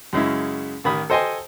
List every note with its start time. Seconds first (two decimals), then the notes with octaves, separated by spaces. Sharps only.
0.13 F#2 C#3 G#3 E4
0.84 A1 D#3 B5 D#6
1.10 A4 C5 D#5 G5 G#5 C6